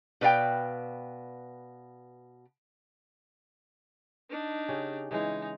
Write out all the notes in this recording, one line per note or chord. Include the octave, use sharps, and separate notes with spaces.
B2 B4 D5 F5 G5
D4 D#4
C#3 C#4 G4
C#3 E3 G#3 D#4